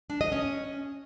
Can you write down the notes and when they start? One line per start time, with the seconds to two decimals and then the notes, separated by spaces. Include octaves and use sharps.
0.10 D4
0.21 D#5
0.32 C#4